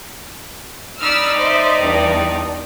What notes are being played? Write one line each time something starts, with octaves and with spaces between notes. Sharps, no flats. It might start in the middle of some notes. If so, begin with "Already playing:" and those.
D#4 D5 B5 E6 F6
C5 D#5 E5
E2 G2